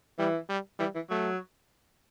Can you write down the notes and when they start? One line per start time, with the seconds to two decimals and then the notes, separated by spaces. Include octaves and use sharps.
0.18 E3 G3
0.49 G3
0.79 E3 G3
0.95 E3
1.10 F#3 A3